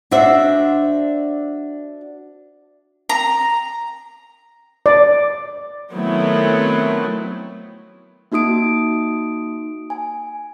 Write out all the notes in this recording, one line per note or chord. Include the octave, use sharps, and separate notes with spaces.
D4 F#4 C5 E5
A#5
D5
D#3 F#3 A3 B3 C4 E4
A#3 D#4 F#4 D#6 D7
G#5